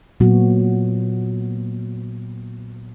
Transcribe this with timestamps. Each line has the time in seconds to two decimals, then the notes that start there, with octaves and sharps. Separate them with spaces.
0.20 A#2 F#3 B3 F#4